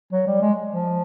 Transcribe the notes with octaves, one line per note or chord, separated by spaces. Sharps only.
F#3
G3
G#3
F3